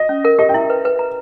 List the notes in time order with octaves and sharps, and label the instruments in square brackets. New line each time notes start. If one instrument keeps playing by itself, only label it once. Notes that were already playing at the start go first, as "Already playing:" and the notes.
Already playing: [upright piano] D#5
[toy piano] C#4
A#4
[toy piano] G4 [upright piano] D#5
[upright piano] G5
[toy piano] E4 [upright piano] E5
[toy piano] B4
B4
A#5